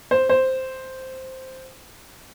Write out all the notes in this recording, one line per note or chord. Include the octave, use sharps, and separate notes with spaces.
C5
C5